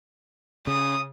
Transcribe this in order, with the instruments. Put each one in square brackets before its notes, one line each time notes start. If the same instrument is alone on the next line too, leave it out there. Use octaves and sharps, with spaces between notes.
[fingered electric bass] C#3 [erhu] D#6